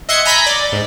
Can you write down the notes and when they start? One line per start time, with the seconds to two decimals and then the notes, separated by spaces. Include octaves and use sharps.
0.09 D#5 E5 F#5 C6 G#6 C#7
0.25 G#5 A#5 B5 G6 A#6 B6
0.47 D5
0.72 G#2